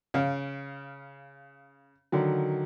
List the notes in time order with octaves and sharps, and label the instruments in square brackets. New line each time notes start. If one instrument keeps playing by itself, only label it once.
[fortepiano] C#3 F5
[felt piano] D3 D#3 F#3